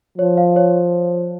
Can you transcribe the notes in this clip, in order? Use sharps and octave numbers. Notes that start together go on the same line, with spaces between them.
F3 C#5
F5
C#5